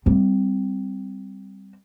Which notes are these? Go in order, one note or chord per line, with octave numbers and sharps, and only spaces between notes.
G3 C4